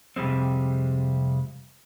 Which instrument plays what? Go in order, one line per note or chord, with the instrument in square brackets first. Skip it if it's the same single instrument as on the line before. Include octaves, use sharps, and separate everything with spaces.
[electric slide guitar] F2 C3 G3 G#3 C4